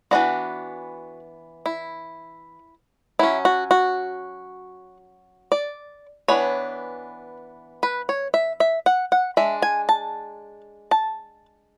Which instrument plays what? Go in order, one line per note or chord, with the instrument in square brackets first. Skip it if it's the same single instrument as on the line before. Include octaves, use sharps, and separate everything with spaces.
[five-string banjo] E3 G#3 B3 D4 F#4
E4
F#3 C#4 E4
F#4
F#4
D5
E3 B3 D4 C#5
B4
C#5
E5
E5
F#5
F#5
G#3 D4 E5
G#5
A5
A5